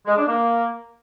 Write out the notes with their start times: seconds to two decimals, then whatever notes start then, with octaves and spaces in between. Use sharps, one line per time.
0.07 G#3
0.17 D4
0.27 A#3